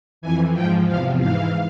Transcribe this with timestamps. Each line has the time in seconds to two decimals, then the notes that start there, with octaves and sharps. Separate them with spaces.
0.22 F2 E3 G#5
0.54 G#2 F3 G5
0.87 E2 C3 F3 F5
1.20 G#2 E3 F5